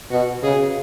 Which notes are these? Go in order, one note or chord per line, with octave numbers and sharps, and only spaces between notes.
B2 F#4
C#3 G#4